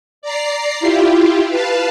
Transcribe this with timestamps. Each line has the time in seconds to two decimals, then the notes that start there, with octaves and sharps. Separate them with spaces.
0.22 D5 A#5 C7
0.80 E4 F4 G4
1.48 B4 F5 A5